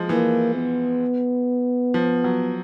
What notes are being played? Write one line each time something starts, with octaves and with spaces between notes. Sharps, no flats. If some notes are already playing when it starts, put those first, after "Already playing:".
Already playing: F3 G#3
E3 A#3
B3
F3
F#3